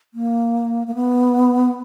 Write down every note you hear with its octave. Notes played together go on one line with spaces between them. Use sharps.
A#3
A#3
B3